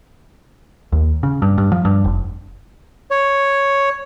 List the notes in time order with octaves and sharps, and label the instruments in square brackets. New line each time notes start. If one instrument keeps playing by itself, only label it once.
[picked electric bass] D#2
C#3
G2
G2
F3
G2
F1
[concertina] C#5